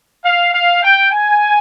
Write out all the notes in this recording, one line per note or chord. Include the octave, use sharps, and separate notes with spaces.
F5
F5
G5
G#5